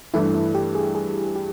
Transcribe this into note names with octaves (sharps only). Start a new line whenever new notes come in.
G2 E3 A3 E4
E4
G4
G#4
G#4
G4